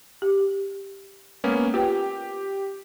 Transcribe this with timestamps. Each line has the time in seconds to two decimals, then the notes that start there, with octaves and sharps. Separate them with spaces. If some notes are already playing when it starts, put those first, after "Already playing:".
0.22 G4
1.44 G#3 A#3 B3 C#4
1.74 F4 G4 B4 G5